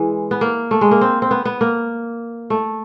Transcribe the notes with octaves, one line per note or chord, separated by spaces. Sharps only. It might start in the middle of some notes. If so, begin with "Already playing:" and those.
Already playing: E3 G#3
B3
A#3
A3
G#3
A#3
C4
C4
B3
B3
A#3
A3